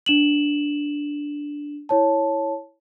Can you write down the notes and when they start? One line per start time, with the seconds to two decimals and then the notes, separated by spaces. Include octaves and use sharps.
0.06 D4 E7 F#7
1.89 E4 C#5 A5